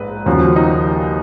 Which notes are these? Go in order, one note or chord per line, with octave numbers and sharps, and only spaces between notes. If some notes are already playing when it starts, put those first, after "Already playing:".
Already playing: A#1 G#2 B4
D#2 C#3 F3 F#4
D#4